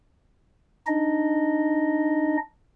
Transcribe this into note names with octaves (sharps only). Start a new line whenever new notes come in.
D4 D#4 D#5